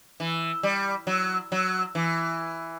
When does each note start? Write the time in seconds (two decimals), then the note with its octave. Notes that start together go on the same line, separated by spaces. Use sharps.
0.20 E3
0.63 G3
1.07 F#3
1.52 F#3
1.95 E3